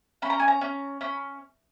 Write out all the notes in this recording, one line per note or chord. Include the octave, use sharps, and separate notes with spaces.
C#4 B5
A#5
G#5
A#5
C#4
C#4 B5